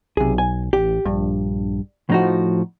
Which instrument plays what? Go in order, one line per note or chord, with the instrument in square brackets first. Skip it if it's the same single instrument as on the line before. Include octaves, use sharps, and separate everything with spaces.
[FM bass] B1 [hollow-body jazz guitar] C3 G#4
[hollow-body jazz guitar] G#5
[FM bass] A1 [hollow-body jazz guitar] G4
[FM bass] A#1 [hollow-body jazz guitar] G2
[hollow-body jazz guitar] A2 D#4 F#4 [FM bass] F3